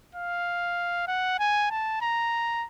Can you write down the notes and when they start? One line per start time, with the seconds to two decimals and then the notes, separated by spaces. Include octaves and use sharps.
0.15 F5
1.08 F#5
1.39 G#5
1.71 A5
2.02 A#5